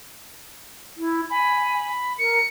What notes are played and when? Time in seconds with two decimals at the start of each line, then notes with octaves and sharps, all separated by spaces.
0.97 E4
1.30 G#5 B5
2.18 A#4 C#7